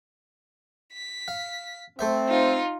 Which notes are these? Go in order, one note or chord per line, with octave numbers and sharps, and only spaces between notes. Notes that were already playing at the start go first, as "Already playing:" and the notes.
B6
F5
A3 C4 C5 E5
D#4 F4